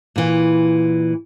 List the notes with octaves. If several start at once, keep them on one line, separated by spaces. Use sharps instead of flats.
A#2 E3